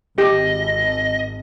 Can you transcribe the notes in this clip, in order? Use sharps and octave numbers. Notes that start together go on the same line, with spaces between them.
G#1 G4 D#5